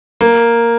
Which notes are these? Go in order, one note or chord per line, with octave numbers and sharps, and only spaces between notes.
A#3